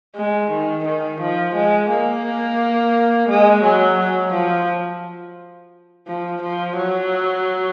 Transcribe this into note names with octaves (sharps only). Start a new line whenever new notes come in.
G#3
D#3
D#3
F3
G#3
A#3
G#3
F#3
F#3
F3
F3
F3
F#3